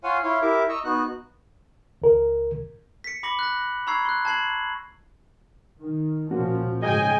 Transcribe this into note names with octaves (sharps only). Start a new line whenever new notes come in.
F4 C#5 F5 F#5 G#5 C6
E4 C#5 F5 C6
E4 G4 A#4 E5 D6
D#5 A#5 C#6 E6
B3 D#4 F#4 F#6
C#2 A#4
B6 C#7
B5 D6 A#6 C#7 F#7
F#6 A#6
A#5 B5 C#6 E6 G#6 C7
C6 F#6
A5 G#6 C7 F#7
D#3
A#2 F3 A#3 C#4 F#4
G#2 C#3 G#4 D#5 G5 G#5